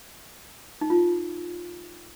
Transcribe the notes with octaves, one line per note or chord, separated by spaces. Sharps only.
D#4
F4